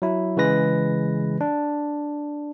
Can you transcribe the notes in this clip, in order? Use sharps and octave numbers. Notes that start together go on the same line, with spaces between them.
F#3 E4
C#3 E3 G#3 B4 A#6
D4